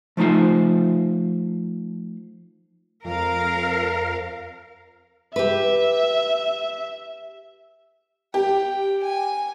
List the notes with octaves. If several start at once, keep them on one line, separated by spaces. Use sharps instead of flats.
F3 A3 D#4 F4 F5
F2 A#4 F5
G4 B4 E5
G4 G5
G#5